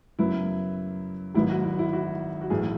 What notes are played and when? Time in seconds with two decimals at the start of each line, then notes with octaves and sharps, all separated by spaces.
0.19 F#2 C#3 F#3 B3 E4
1.34 G#1 G#2 F#3 B3 E4
1.50 F#4
1.64 E4
1.79 E4
1.93 F#4
2.41 F#4
2.50 B1 A2 E3 A3 G#4